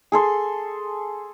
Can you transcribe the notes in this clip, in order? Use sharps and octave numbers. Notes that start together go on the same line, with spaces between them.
G#4 A4 C6